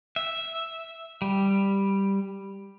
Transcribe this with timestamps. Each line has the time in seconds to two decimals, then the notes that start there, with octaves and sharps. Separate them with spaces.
0.16 E5
1.22 G3